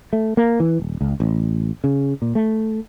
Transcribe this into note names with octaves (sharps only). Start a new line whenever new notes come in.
A3
A#3
E3
D#1
C#2
A1
C#3
A#2
A3